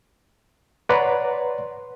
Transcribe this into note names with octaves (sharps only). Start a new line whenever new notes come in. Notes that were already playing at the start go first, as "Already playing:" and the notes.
B4 C#5 D5 F#5 A#5 C6